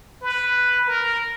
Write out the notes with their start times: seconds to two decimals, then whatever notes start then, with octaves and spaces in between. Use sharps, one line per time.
0.22 B4
0.88 A#4